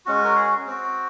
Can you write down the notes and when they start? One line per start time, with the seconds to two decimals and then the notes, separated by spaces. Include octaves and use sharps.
0.06 G#3 C#4 F#4
0.24 A#4
0.36 G#4
0.66 C4 F#4